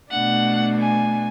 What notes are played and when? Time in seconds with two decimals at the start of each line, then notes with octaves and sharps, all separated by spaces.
0.12 B2 A3 D4 F#5
0.79 G#5